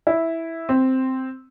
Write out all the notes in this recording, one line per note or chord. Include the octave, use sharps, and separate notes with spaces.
E4
C4